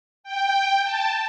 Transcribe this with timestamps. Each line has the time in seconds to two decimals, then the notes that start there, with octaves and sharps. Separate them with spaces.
0.24 G5
0.84 A5